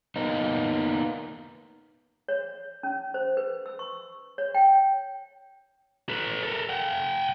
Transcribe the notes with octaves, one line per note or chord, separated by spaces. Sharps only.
A#3 B3 D#4
C#5
C#4
C5
B4
E6
C#6
C#5
G5
A4 B4
A4 A#4
F#5 G5